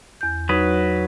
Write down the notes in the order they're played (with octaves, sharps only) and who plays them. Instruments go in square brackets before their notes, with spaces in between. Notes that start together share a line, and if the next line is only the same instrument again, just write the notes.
[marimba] E2 G6
[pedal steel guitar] F#3 B4 [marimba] D#4